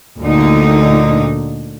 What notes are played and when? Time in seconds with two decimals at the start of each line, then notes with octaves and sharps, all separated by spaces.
0.20 D2 A#2 D3 D#4